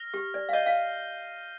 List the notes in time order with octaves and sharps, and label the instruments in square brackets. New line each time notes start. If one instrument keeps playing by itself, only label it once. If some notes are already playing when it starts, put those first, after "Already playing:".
Already playing: [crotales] F6 A#6 F7
[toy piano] G4
D5
F5
[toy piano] D#5 [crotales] G6 C7 D#7 G7
[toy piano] F5